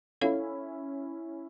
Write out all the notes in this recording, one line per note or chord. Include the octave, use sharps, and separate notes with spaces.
C#4 E4 A4 C#5 F5